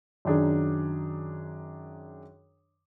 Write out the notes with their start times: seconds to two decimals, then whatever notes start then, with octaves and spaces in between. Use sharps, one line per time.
0.25 F#2 D#3 D4 G#4